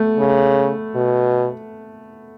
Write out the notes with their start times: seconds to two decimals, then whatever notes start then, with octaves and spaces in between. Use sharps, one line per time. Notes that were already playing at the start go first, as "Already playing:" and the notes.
Already playing: A3 B3
0.19 C#3
0.95 B2